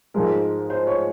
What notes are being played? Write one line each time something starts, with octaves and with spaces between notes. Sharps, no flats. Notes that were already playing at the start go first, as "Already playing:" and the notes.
G#2 F3 G#3 A#4
C5
C#5